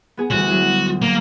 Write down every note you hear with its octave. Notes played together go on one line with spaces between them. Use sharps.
B3 G#4
D2 E3 G3 F#4
F#3
A#3